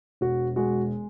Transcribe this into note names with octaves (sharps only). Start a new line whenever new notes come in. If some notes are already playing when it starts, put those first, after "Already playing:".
E1 F#4
G#3 F#4